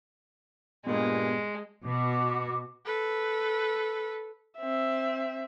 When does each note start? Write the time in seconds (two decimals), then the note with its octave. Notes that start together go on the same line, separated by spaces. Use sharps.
0.87 G2 A#2 G#3 B3
1.85 B2 F#4 D6
2.85 A4 B4
4.58 C4 E5